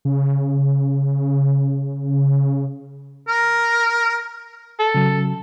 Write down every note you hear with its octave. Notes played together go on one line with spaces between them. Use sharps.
C#3
C#3
A#4
A4
C#3 F#3